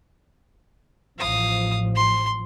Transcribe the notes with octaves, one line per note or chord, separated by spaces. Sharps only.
A1 F3 F5 D#6
C6